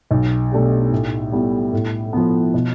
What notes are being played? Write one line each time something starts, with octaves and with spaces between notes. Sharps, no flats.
B1
B2 A3 D4 G4
A2
G3 B3 E4
A2
F3 B3
B2